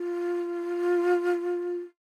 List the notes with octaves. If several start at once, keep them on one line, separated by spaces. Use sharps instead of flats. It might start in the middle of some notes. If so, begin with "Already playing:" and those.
Already playing: F4